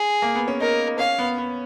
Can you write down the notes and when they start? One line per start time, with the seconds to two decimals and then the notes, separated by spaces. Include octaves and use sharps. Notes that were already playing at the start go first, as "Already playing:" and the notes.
Already playing: G#4
0.22 A#3
0.35 B3
0.48 C#4
0.60 D#4 A#4
0.99 C#4 F5
1.19 B3
1.38 B3